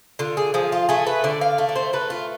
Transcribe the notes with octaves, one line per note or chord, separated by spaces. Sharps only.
D3 F4
G#4
F3 G#4
F4
A3 G#4
B4
D3 D5
F5
A3
D5
C5
A3 B4
F4